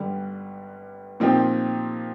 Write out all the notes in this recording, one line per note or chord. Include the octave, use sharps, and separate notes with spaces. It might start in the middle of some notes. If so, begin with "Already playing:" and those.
Already playing: G1 G2 D3 G3
A#2 F3 C4 D#4 G4